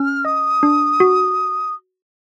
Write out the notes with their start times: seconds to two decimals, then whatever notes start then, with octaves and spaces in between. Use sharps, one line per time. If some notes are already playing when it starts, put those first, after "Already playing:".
Already playing: C#4 F6
0.25 D#5 D#6
0.63 D4
1.00 F#4